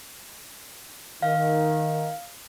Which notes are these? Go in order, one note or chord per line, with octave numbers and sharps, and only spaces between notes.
D#3 F5